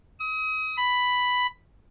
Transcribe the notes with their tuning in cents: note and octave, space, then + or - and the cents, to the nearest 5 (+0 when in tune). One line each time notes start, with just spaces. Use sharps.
D#6 +35
B5 +5